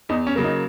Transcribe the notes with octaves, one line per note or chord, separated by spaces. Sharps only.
E2 D#4
C#4
C#3 F#3 A#3
D#4